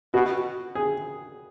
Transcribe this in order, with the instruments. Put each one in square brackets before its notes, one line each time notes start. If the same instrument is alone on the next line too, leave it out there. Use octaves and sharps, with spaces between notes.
[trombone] B2 [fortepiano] F#4
[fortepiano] G#4